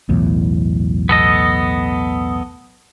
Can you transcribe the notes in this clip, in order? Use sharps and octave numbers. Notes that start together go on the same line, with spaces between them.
B1 E2 A2
B3 A4 D#5